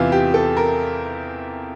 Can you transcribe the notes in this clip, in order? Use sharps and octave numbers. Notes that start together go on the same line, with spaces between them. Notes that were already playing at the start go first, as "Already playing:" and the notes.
Already playing: E2 C3 E3 F4
G4
A4
A#4